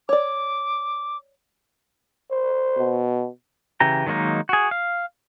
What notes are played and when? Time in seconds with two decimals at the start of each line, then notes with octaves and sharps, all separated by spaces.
0.09 C#5 D5 D6
2.31 C5
2.77 B2
3.80 C#3 E3 G4 A#5
4.06 D#3 F#3 G#3 A#3 D#4
4.49 F#4 G#4
4.71 F5